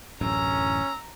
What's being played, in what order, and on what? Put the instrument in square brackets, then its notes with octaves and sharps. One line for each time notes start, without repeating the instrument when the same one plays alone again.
[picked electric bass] D1 A1 F#2 [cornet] C#4 [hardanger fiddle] A#5 [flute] E6